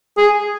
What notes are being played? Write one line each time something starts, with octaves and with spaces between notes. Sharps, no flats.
G#4